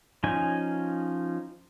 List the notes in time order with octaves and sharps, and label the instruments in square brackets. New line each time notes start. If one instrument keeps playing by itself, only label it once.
[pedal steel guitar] F3 C#4 D#4 G#5